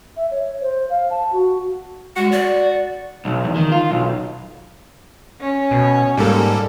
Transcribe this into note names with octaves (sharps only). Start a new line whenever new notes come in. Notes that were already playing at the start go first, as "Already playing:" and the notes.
E5
C#5
C5
F5
A5
F#4
G#3 F#4
D5
B1
E2
D#3
F4
B1
C#4
B2
G#2 G3 A#3 A4